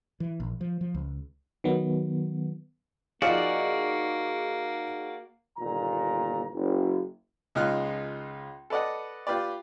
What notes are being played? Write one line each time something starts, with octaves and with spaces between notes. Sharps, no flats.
E3
A#1
F3
F3
C#2
D#3 F#3 B3
F3 A#3 D#4 F4 F#4 G#4 D5
G1 D#2 A#2 A#5
F#1
C#2 G#3 D#4 F4 F6 F#6
A4 B4 D5 D#5 F#5
F4 G4 B4 D5